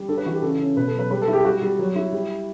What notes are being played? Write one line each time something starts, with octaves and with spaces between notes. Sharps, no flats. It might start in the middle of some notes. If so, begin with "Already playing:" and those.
Already playing: G3
D4 A4
B4
E3 F#4
G4
C#3 A4
C#4
B2 B4
A4
F#3
B4
G3 B4
A4
E4
G4
G3 F#4
G3
F#3
E4
G3